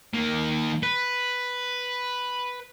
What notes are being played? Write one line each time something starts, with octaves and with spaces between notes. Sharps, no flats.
D#3 A#3
B4